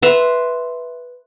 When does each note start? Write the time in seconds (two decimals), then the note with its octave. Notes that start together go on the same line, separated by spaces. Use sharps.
0.02 B4 E5 A#5 C6